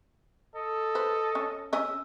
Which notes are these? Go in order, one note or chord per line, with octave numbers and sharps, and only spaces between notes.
A4 D#5
B4 C5
C#4
C#4 D#5 E6